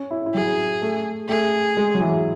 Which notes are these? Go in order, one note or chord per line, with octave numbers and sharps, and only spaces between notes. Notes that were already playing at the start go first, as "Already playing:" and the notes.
Already playing: C#4
E4
E4
F#3 G#4
A3
A3 G#4
G#3
F#3
E3